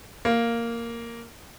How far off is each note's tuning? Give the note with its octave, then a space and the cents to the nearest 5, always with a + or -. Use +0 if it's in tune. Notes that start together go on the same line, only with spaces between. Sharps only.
A#3 -5